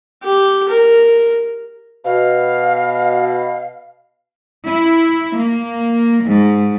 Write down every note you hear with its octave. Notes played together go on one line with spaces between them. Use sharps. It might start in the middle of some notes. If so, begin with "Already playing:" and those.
G4
A#4
B2 F5
E4
A#3
G#2